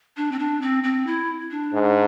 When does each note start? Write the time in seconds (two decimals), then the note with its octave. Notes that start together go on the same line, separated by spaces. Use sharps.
0.17 D4
0.32 C4
0.39 D4
0.62 C4
0.83 C4
1.07 E4
1.51 D4
1.73 G#2